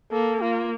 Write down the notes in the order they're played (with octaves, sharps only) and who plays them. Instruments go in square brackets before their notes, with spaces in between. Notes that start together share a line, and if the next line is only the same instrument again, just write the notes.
[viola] A#3 [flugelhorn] A4
[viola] A#3 [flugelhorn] F4